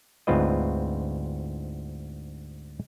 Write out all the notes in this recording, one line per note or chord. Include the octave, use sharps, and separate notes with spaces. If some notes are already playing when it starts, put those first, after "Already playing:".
D2 G#2 C4 F4 B4 D#5